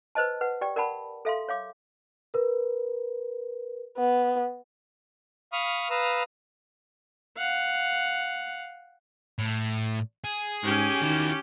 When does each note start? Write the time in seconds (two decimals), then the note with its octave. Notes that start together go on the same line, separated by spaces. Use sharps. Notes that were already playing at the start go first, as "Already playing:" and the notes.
0.15 B4 C5 D#5 A5
0.41 B4 F#5
0.61 G4 D5 G5
0.76 A#4 D5 F#5 A5 B5
1.25 A4 E5 F5 C6
1.48 C#5 F5 D6
2.34 A#4 B4
3.98 B3
5.53 F5 B5 C#6 D#6 F6
5.90 B4 F5 A#5 D#6 E6
7.38 F5 F#5
9.39 A2
10.24 G#4
10.63 G#2 C#4 G4
11.02 D#3 E4 F#4